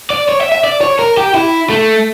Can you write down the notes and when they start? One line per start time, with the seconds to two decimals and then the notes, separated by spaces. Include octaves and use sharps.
0.10 D5
0.29 C#5
0.41 E5
0.52 E5
0.64 D5
0.81 C#5
0.99 A#4
1.17 G4
1.34 E4
1.70 A3